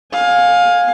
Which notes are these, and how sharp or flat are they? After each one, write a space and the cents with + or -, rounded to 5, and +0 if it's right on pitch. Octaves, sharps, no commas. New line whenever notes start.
F5 +20 G#5 +0